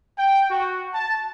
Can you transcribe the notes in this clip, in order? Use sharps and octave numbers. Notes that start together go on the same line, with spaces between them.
G5
F#4
A5